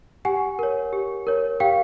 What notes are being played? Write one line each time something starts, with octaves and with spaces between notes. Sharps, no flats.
G4 F#5 G#5
A#4 C#5
G4
A#4 C#5
G4 F5 G5